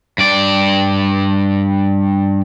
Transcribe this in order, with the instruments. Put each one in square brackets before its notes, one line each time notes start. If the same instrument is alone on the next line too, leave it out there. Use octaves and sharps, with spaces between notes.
[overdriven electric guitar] G2 D5